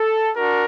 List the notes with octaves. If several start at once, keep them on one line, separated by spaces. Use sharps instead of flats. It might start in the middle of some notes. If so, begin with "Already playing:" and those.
Already playing: A4
D4 F#4 A#4